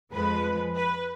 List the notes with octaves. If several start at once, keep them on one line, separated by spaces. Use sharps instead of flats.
F2 F3 G#3 B4
B4